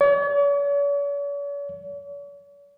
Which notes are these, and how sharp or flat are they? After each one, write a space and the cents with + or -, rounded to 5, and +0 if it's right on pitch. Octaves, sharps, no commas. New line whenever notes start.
C#5 +45